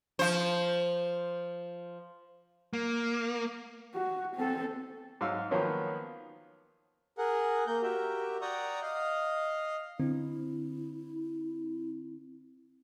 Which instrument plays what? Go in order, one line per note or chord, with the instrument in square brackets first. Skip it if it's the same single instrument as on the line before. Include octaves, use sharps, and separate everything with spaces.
[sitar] F3 C5
[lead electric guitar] A#3
[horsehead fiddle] F#4
C4 A4
[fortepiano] G#2 F#3 F5 E6
D#3 F3 F#3 A#3 B3 C#4
[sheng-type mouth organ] G#4 A#4 F#5
A#3 A#4 G6
F#4 G4 A#4 E5
D5 F#5 G5 A#5 C#6 D#6
D#5 F5
[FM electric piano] D3 C4 [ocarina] E4